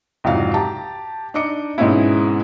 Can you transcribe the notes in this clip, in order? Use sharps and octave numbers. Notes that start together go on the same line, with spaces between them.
C2 F2 G#2 F#3 F#4 F5
G4 A5 A#5
D4 D#4 D#5 D6 C#7
G#2 B2 G#3 C4 C#4 E4